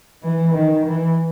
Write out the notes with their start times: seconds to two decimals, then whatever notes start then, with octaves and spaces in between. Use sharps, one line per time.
0.23 E3
0.54 D#3
0.86 E3